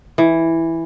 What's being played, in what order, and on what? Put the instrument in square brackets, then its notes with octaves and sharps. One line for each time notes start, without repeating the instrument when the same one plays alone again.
[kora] E3